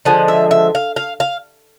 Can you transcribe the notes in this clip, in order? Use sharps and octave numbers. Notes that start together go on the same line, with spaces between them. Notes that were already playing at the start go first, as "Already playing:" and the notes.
D3 F3 G#3 F#5
E5
E5
F5
F5
F5